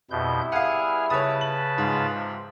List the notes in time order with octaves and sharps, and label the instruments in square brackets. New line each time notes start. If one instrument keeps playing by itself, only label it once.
[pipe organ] F2 B2 G6 [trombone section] G3 B3 E4
[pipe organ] G#4 G#5 F6 [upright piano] F5 F#5
[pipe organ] C#3 B4 A5 [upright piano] C#5 D#6
[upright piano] F#7
[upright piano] G#2 [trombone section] G#3 F4
[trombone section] C3 F3